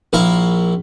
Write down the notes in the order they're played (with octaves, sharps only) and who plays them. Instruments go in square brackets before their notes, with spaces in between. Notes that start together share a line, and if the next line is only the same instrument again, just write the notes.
[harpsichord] A#1 A#2 E4 F5 A#5